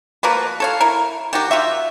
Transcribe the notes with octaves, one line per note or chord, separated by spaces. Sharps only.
F3 A#3 F#4 B4
A4 C#5 F5
E4 A#4
D#3 F#4 G4
F4 F#4 E5